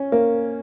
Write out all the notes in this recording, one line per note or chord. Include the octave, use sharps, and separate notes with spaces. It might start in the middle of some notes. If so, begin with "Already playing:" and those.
Already playing: C#4
A#3